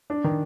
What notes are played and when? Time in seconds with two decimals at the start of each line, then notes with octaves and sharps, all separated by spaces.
0.10 D4
0.24 D#3